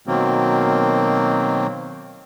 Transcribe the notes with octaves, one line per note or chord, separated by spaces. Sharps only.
B2 D#3 F#3 A#3 C4